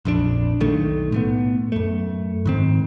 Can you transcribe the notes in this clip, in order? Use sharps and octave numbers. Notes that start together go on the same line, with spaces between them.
A#1 F2 C#3 D4
B1 D#3 A3
A2 A3 B3
F#2 A3
G#2 D#3 C4